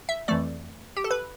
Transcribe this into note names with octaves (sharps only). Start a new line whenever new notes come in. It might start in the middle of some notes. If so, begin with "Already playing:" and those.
E5
F2 E3 A3 D5
G4
A4
B4